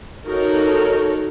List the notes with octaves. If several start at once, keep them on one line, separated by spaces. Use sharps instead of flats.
D#4 F#4 A4 A#4 C#5